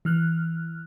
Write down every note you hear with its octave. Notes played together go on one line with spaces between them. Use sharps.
E3 F6 F#6